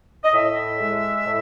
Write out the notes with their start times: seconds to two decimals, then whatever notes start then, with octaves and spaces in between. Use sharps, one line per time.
0.24 D#5
0.33 A2 E5
0.80 G#3
1.25 A2